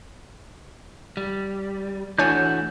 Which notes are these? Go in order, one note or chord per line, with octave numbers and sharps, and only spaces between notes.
G3
E3 A3 D4 F#4 C#5 G#5 G6